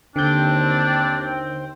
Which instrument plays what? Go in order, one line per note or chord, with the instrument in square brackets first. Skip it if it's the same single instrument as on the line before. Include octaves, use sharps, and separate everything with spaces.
[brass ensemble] D#2 G5 [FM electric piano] D3 G6 [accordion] C4 [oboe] D4